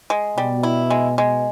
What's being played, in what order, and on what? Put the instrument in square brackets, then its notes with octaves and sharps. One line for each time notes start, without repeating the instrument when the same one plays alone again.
[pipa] G#3
[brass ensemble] B2 [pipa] G3
[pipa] E4
G#3
G#3